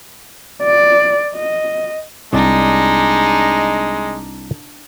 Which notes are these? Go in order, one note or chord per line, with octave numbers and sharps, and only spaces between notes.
D5
D#5
C2 G#3 D4 D#4 D5